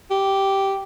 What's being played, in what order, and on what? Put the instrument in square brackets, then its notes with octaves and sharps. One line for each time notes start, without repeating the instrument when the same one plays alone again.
[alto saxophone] G4